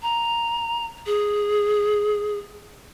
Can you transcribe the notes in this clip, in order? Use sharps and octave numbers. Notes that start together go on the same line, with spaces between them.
A#5
G#4